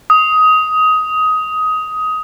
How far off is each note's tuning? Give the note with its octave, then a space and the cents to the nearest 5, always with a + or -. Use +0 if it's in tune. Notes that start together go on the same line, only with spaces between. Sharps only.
D#6 +15